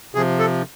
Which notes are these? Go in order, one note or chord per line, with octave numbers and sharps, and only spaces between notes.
C3 F3 G#4
A4